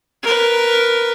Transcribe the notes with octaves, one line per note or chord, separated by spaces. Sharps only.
A#4 B4